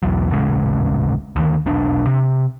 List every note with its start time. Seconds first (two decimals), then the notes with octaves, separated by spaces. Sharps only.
0.03 B1 E2 F#3
0.30 D#1 A1 C#3 G#3
1.36 D2 D#3
1.66 E1 B1 D4
2.07 C3